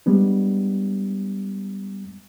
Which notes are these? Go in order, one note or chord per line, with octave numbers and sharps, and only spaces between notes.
G3 G#3 B3 D4